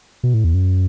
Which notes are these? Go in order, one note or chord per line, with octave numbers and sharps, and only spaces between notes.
B2
A2
E2
F#2